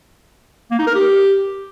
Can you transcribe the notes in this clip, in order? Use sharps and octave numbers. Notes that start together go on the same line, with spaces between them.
A#3
D#4
A#4
G4